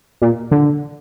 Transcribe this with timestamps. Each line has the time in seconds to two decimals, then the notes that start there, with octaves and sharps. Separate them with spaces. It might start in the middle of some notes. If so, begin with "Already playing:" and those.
0.22 A#2
0.51 D3